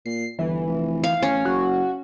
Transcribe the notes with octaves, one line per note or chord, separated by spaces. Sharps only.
A#2 C7
G1 E3
F1
F5
A1 C#4
F#1 F#4